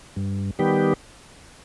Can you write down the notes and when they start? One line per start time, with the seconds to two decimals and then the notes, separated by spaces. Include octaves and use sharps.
0.16 G2
0.59 D#3 G3 B3 G4